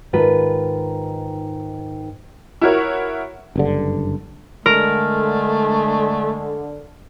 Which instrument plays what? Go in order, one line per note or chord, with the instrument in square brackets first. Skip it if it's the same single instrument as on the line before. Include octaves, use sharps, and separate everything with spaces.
[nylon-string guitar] G#2 D#3 F4 B4 A5
[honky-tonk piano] E4 F#4 A#4 C#5
[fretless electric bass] F#1 G2 D3
[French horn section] D3 [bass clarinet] G#3 [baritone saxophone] A3 [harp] A#4